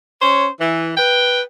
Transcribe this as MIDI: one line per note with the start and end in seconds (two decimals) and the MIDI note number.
0.22 0.48 61
0.22 0.48 72
0.22 0.48 73
0.59 0.92 52
0.97 1.41 71
0.97 1.41 79